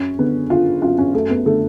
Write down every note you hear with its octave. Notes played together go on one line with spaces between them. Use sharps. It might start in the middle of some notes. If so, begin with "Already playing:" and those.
Already playing: F#2 C#4
D3 B3
D3 F4
F#2 F4
C#4
F#2 A3
B3
D3 A3